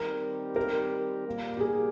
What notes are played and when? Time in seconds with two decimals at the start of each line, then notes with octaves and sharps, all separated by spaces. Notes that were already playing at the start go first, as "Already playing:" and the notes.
Already playing: D#3 G3 C4 G4 A#4
0.56 A#4
1.26 A#2 G3 A#3
1.57 G4
1.61 G#4